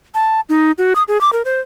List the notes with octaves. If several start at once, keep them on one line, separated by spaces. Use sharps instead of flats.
A5
D#4
F#4
D#6
G#4
D6
A#4
C5